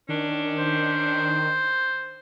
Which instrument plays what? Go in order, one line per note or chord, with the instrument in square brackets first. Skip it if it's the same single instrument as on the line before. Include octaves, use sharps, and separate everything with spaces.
[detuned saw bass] D#3 [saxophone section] C#4 D4
[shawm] C5